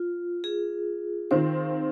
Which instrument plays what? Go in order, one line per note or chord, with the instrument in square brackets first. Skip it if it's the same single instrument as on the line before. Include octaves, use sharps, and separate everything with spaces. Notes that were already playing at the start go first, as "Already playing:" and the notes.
Already playing: [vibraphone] F4
G#4
[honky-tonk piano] D#3 C4 F4 [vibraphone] C5